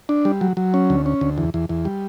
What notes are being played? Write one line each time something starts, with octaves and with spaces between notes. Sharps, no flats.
D4
G3
F#3
F#3
C#4
D2
C#4
D2
E2
E2
E2
G3